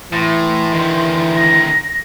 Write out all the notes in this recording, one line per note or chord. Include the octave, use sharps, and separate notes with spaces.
A2 E3 C6
D2 D#3
A#6